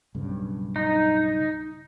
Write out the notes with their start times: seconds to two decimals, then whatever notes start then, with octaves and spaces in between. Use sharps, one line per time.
0.15 B1 G2 C#3
0.76 D#4